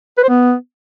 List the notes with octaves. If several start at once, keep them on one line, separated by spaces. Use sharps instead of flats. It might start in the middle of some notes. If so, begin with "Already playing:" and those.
B4
C5
B3